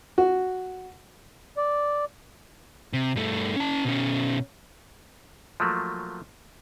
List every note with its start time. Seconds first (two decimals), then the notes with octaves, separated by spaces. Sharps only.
0.18 F#4
1.57 D5
2.93 C3
3.16 G2 A3
3.56 C#4 A5
3.85 B2 C#4
5.60 F3 F#3 A3 A#3